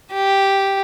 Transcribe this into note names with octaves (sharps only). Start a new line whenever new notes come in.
G4